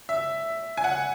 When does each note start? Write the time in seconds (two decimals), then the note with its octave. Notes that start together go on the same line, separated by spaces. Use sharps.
0.09 E5
0.77 G#5
0.84 F#5